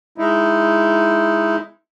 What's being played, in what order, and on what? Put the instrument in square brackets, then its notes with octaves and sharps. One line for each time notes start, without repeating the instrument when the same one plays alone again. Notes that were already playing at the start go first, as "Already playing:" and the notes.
[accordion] G#3 D#4 E4